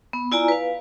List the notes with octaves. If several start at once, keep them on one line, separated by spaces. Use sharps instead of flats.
B3
E4 F4 D5 G#5 A#5
B4 F5